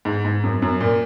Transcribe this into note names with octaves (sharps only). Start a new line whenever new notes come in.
G#2
G#2
F#2
F#2
A#2